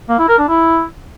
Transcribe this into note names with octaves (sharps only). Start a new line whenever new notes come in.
A#3
E4
A#4
D4
E4